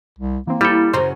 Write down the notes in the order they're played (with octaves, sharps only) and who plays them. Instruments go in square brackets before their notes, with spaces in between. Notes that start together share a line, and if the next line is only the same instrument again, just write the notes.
[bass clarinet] C2
[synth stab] E3 C4 [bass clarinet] A#3
[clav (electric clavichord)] G3 A4 [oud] E4
[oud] F#2 C#3 [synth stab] C5 A#5